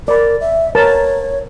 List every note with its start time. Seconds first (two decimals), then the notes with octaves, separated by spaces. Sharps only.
0.08 A#4 D5 B5
0.41 E5
0.75 A#4 B4 C#5 A5